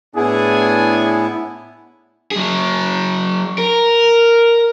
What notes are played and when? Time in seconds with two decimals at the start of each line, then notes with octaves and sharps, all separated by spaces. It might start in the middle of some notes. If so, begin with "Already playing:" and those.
0.16 A2 B3 D4 E4 G#4 G#5
2.31 F#3 G#4
3.58 A#4